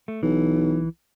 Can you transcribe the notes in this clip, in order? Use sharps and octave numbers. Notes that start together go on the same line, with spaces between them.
A3
B1 E3